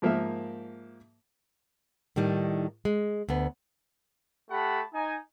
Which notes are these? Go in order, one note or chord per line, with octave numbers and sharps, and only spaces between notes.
G#2 F3 A#3 A#4 E5
A2 D#3 G3 D#4
G#3
D2 B3
A3 G4 F#5 A5 B5
D#4 G#5